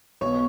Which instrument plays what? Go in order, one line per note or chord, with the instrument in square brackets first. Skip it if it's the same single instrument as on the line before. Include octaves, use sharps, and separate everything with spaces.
[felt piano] B1 B2 B3 [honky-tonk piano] C#5